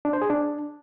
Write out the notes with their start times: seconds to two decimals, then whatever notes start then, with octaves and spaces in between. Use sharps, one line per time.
0.05 D4
0.13 C5
0.22 G#4
0.30 D4